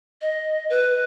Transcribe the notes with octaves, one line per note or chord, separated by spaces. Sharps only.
D#5
B4